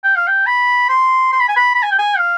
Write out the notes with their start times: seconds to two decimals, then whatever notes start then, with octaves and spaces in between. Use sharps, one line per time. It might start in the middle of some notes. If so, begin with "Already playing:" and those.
0.04 G5
0.16 F5
0.27 G5
0.46 B5
0.89 C6
1.32 C6
1.40 B5
1.48 G#5
1.56 B5
1.75 B5
1.83 G#5
1.91 G5
1.99 G#5
2.17 F5